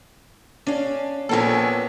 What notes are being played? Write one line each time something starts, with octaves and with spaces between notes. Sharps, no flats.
C#4 D4 F5
A#1 A#3 B3 C#4 A4